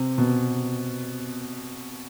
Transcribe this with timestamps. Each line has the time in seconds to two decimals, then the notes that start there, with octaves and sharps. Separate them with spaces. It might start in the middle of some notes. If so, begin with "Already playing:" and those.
Already playing: C3
0.18 B2